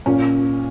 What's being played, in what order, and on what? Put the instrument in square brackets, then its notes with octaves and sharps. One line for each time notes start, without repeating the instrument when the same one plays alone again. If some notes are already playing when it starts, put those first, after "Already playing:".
[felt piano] A#2 C#4